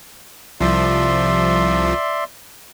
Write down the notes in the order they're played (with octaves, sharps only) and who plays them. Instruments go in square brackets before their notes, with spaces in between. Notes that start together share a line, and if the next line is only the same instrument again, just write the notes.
[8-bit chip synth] C2 F3 [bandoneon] D5 E5 C6